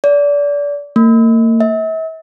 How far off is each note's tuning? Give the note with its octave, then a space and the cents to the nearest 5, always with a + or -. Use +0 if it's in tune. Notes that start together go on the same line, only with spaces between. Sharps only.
D5 -30
A#3 -40
E5 -40